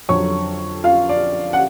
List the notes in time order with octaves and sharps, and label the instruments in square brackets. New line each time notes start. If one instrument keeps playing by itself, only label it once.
[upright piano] F2 D3 F#3 C#5 C#6
F4 F5
D5
F#5